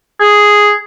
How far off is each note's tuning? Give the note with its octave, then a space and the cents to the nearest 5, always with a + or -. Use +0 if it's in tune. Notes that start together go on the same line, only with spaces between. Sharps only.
G#4 +0